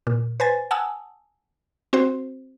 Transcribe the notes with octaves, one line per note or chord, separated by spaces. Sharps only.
A#2
B4 C5 G#5 A6
F#5 G#5 A5 D#6 E6
C4 F#4 C5